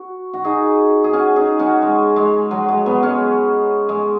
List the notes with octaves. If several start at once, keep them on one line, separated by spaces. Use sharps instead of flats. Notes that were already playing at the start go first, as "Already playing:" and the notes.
Already playing: F#4
F#4
D#4 G#4
G#4
C#4 F#4
D#4 G#4
C#4 F#4
G#3
G#3
F#3
G#3
F#3 B3
G#3 C#4
G#3